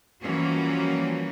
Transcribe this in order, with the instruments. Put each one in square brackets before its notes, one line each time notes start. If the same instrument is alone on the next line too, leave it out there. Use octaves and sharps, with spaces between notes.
[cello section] E3 F3 G3 A#3 C#4 F#4